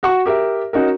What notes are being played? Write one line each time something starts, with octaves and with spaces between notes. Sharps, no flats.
F#4 F#5 C#6
G4 A#4 E5
C#4 D#4 F#4 A#4